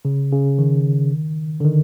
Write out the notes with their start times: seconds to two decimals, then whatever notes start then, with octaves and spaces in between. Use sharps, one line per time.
0.05 C#3
0.32 C#3
0.58 D#3
1.60 D3
1.65 D#3